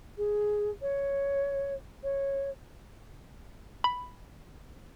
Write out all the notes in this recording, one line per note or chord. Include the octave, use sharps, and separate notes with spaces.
G#4
C#5
C#5
B5